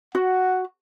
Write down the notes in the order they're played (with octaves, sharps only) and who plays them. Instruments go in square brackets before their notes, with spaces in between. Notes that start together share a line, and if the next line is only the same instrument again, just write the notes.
[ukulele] F#4 [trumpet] F#5